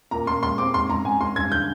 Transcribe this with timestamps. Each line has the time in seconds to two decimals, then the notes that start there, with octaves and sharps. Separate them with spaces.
0.11 A#2 A#5
0.27 A#2 C6
0.43 G#3 C6
0.58 C4 D6
0.74 G#2 C6
0.89 G#2 A#5
1.05 G#2 G#5
1.20 G#2 C6
1.36 G2 G#6
1.51 D3 G6